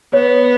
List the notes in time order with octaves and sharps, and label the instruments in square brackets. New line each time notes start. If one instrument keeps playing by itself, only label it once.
[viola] B3 [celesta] C#5